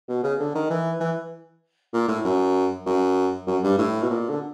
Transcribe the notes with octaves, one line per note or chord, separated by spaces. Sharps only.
B2
C#3
D3
D#3
E3
E3
A#2
A2
F#2
F#2
F#2
G2
A2
B2
A#2
D3